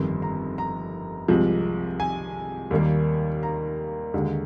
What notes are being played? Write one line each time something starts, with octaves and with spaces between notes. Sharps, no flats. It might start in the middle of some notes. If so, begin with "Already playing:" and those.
Already playing: G1 F2 D#3 C6
A#5
A#5
C2 C3 F3 G#3
G#5
D#2 D#3 G3 A#3
A#5
D#2 D3 G#3